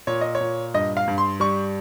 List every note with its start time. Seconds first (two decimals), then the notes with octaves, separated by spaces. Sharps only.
0.07 A#2 C#5
0.21 D#5
0.35 C#5
0.40 A#2
0.74 G2 D#5
0.97 F5
1.08 G2
1.18 C6
1.40 G3 C#6